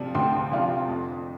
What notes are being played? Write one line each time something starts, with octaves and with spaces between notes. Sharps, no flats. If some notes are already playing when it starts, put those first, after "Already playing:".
Already playing: C3 F3 D4 F4
D2 G5 C6
C3 F3 D4 F4
F2